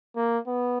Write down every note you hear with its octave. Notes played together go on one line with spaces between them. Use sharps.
A#3
B3